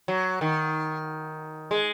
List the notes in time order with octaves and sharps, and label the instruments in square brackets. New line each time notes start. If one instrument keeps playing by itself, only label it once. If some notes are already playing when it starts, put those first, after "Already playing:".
[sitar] F#3
D#3
G#3